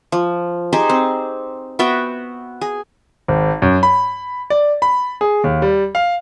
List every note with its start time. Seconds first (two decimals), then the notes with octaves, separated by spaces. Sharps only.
0.12 F3
0.73 D#4 G4 G#4 C5
0.89 C4
1.79 B3 F#4 E5 G5
2.61 G#4
3.28 G#1
3.62 F#2
3.83 B5
4.50 D5
4.82 B5
5.21 G#4
5.44 D#2
5.62 G3
5.95 F5